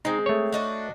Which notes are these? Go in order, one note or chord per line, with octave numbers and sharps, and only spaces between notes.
G#3 C4 D#4
A3 C#5
D4 D#4 F#4